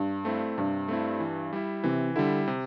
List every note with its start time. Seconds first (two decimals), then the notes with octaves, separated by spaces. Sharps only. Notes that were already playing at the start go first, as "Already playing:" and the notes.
Already playing: G2
0.25 A3 C4 E4
0.58 G2 C3
0.88 A3 C4 E4
1.20 E3
1.53 G3 E4
1.84 C3 E3
2.16 D3 G3 E4
2.48 C3